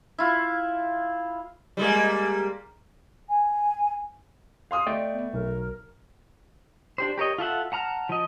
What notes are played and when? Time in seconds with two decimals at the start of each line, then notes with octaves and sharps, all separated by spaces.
0.18 E4 F4
1.77 G3 G#3 A#3
3.29 G#5
4.71 F5 C6 D#6
4.87 A3 D5 D#5 G5
5.13 B3
5.33 B1 A#4
6.98 D4 G4 C5
7.18 G4 A#4 C#5 D#5
7.38 F4 A4 E5 F#5
7.72 F#5 A5 A#5 F6
8.09 F3 D#5